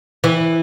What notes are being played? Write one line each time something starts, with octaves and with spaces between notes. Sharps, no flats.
E3